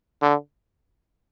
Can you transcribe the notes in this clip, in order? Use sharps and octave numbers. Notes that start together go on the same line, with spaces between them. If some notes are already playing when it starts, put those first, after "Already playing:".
D3